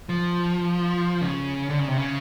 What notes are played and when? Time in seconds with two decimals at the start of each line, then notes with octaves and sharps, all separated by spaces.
0.09 F3
1.21 C#3
1.70 D3
1.79 C#3
1.88 C3
1.97 C#3